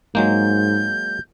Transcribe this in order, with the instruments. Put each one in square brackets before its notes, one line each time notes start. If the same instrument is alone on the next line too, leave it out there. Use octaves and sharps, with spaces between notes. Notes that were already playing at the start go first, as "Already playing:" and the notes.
[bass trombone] G#2 [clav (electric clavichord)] F#3 G#3 A#3 [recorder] G6